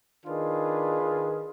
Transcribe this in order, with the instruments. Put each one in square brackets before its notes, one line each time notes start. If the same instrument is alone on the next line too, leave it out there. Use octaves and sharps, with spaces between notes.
[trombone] D#3 [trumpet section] D4 F4 G#4 B4
[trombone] D#3